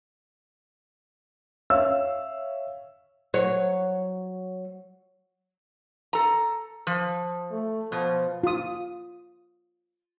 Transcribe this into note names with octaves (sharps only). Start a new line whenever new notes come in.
C#5 E5 F5 E6
F#3 C#5
A4 A#5
F3
A3
B2 F3
F4 D#6